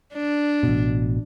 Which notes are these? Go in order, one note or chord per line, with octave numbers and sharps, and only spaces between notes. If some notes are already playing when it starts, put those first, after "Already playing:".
D4
A1 B2